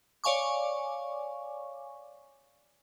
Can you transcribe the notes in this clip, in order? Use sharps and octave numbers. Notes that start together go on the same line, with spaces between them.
C#5 D5 F5 G#5 C#6 D6